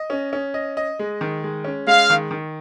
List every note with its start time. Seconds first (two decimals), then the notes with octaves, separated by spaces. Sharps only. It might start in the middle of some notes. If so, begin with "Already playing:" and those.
Already playing: D#5
0.10 C#4
0.33 C#4
0.54 D#5
0.77 D#5
0.99 G#3
1.21 D#3
1.44 G#3
1.64 C#4
1.87 G#3 F5
2.10 D#3
2.31 D#3